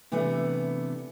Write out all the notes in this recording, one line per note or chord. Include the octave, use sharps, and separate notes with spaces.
C3 E3 A3 B3 D4